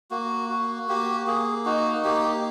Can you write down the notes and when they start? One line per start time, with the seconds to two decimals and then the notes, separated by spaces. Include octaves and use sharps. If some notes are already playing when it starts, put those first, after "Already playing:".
0.11 A#3 F#4
0.50 F#4
0.88 A#3 G4
1.27 A#3 G#4
1.65 D#4 F#4
2.04 A#3 G4